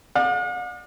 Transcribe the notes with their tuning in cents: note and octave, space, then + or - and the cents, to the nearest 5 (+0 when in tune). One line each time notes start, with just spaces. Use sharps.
D5 +35 F#5 -45